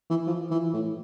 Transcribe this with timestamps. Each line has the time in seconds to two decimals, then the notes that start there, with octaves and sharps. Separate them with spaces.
0.10 E3
0.27 F3
0.51 E3
0.73 A2